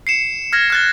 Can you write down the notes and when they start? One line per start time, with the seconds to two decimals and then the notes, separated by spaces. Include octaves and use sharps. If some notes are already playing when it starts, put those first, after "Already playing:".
0.07 C7 C#7 E7
0.53 F6 G#6 A#6
0.70 F6 F#6 A6